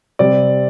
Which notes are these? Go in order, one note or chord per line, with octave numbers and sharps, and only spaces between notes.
C3 G3 C4 D5